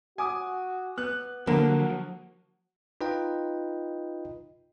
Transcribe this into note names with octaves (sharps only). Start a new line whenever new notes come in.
F#4 G#5 D6 D#6
B3 F#6
D3 F3 F#3 A#3 F#4
D#4 F4 B4 D#5 G5